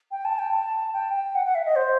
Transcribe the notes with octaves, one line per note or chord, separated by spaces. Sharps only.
G5
A5
G5
A5
G5
G5
F#5
F#5
E5
D#5
C5